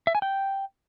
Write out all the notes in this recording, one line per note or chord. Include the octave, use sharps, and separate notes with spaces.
E5
G#5
G5